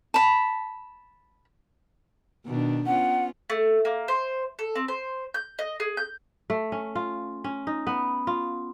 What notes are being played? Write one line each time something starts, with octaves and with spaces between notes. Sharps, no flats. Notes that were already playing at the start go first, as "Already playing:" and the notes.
A5 B5
B2 D#3 D4
B3 C#4 F4 F#5
A3
A#3
C5
A4
C4
C5
G6
D#5
G#4
G6
A3
C#4
F4
C#4
D#4
B3
F4